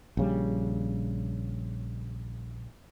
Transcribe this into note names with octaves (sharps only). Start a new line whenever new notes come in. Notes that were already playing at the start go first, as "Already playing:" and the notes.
A#1 C#3 G3